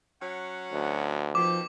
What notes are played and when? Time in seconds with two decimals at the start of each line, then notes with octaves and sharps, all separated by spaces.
0.21 F#3 C#4 F#5
0.72 D2
1.35 B2 D#3 F3 G4 D6